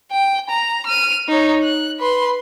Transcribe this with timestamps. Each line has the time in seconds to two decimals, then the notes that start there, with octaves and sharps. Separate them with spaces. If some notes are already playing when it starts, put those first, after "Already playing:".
0.12 G5
0.49 A#5
0.86 F6 D#7
1.29 D#4 C#5
1.64 F#6
2.00 B4 C6